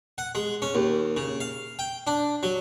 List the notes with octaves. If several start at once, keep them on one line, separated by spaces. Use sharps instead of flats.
F#5
G#3
C#4
D#2
C#3
F5
G5
D4
F#3